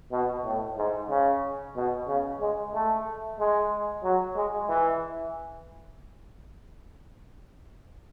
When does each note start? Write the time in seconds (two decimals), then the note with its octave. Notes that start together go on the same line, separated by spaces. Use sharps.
0.12 B2
0.45 A2
0.77 G#2
1.10 C#3
1.76 B2
2.08 C#3
2.41 G#3
2.74 A3
3.39 G#3
4.04 F#3
4.37 G#3
4.69 E3